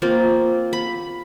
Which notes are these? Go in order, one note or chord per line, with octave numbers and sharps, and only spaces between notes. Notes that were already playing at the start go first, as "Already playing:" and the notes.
A#3 C4 F4
B5